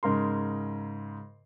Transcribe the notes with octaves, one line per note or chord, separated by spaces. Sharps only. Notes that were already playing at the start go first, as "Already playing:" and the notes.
G#2 C#3 A#4 C6